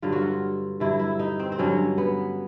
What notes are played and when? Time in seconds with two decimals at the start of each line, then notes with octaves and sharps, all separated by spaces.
0.02 G2 D3 F#3 F4
0.12 F#4
0.22 F4
0.80 G2 D3 F#3 E4
0.99 E4
1.19 D#4
1.39 C4
1.52 C4
1.59 G2 D3 F#3 C#4
1.98 B3